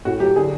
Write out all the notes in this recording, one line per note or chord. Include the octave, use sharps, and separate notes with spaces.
A2 F#4
F#3 G4
D3 G#4